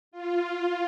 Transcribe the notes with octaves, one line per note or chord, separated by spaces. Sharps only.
F4